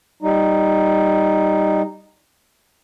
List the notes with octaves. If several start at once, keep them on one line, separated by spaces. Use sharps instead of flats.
G3 D#4